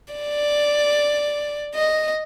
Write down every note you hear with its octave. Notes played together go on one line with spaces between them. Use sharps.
D5
D#5